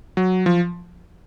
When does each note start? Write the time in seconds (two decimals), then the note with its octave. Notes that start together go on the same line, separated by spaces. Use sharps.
0.17 F#3
0.46 F3